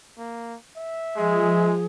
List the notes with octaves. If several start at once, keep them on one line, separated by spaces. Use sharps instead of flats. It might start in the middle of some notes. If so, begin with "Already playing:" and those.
A#3
E5
F3 G#3 G#4